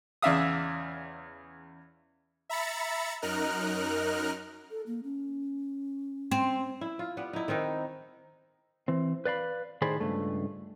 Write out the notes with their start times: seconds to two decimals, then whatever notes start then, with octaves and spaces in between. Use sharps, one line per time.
0.22 E2 C#3 D5 E5 F5 D#6
2.50 E5 A#5 B5 A6 C#7
3.22 F#2 D#4 A#4 F6 F#6
4.71 A4
4.87 A#3
5.03 C#4
6.31 C4
6.81 E4
6.99 F4
7.17 G3 B3 B4
7.33 D#4 E4
7.48 D#3 C4 D#4 B4
8.88 E3 C4
9.25 B4 D5 F5 B5
9.82 A2 D#3 G#4 C5 D5 B5
10.00 C#2 G2 A3